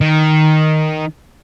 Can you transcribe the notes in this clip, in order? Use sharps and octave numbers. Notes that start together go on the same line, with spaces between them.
D#3